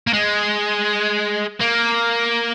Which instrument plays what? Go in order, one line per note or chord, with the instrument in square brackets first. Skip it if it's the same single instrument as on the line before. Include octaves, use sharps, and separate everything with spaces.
[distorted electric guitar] A#3
G#3
A#3